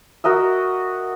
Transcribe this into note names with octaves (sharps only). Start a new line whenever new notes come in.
F#4 A#4 D#5 E5